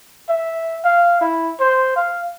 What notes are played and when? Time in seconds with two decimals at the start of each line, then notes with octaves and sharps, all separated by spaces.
0.29 E5
0.84 F5
1.21 E4
1.60 C5
1.96 F5